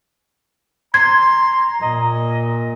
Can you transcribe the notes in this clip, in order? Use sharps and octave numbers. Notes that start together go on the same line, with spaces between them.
A#5 C6 G#6
A#2 D#5